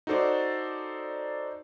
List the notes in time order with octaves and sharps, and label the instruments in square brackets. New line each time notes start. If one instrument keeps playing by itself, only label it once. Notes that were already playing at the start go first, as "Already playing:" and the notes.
[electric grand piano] D#4 F#4 A4 C5 D5